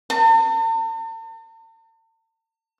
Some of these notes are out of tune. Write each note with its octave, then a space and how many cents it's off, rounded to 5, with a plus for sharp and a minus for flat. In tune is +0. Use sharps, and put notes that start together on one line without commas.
A5 +45